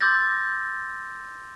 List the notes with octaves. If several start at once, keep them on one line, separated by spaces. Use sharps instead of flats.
C6 D6 E6 G6 A6 A#6